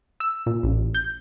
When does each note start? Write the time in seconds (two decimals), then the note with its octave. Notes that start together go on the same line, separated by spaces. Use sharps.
0.20 E6
0.46 A#2
0.63 A1
0.94 G6